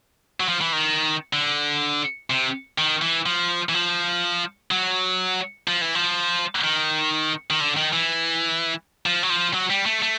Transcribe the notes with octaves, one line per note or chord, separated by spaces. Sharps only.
F#3
F3
E3
D#3
D3
C3
D#3
E3
F3
E3
F3
F#3
F3
E3
F3
D#3
D#3
D3
D#3
E3
F3
F#3
F3
F#3
G3
A3
A3